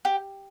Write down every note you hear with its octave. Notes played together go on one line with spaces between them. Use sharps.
G4